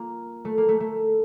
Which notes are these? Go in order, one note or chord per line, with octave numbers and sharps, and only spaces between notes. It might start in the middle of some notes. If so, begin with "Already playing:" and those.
Already playing: A#3 F4
A3
A#3
A3
A3